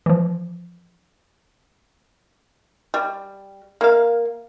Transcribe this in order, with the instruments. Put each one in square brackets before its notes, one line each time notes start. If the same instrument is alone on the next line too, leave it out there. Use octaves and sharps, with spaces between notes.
[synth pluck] E3 F3
[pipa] G3
A#3 F5